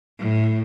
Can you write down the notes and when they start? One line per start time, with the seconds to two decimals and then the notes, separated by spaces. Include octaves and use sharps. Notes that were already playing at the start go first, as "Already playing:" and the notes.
0.19 A2